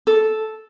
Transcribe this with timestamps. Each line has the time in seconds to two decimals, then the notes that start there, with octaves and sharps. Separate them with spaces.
0.07 A4